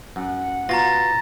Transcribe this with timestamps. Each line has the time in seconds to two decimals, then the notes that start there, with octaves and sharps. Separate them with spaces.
0.16 F#2 F#5
0.69 B2 F4 A#5 A6 A#6